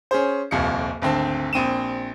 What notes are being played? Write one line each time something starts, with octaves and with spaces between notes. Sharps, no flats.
C#4 G#4 C5
D#1 C2 F2 F5 C#7
G#1 D2 C4 A5
A#1 C4 D#7 E7